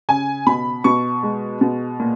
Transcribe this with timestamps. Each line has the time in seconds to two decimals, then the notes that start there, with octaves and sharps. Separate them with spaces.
0.09 C#3 G#5
0.47 B2 B5
0.84 B2 C#6
1.23 G#3
1.61 B2
2.00 A#2